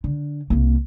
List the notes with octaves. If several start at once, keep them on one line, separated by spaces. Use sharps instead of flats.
D3
C2 A#3